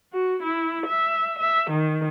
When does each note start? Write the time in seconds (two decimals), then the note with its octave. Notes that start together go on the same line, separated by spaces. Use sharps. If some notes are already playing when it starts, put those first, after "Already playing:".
0.13 F#4
0.42 E4
0.86 E5
1.39 E5
1.70 D#3